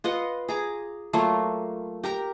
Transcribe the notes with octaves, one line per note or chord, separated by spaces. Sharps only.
F4 B4 D#5 F#5
G#4 A#5 D6
F#3 A3 A#3 F4
G4 A#4 A#5